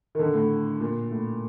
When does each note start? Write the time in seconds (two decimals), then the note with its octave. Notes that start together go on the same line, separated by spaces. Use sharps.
0.15 D#3
0.19 D3
0.34 A2
0.80 A#2
1.11 A2